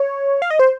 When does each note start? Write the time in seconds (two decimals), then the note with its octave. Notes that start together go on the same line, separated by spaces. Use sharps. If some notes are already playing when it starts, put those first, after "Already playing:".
Already playing: C#5
0.42 F5
0.50 D#5
0.59 C5